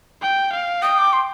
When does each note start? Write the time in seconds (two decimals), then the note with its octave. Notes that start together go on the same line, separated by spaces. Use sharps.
0.22 G5
0.52 F5
0.82 G5 D#6
0.98 D6
1.13 C6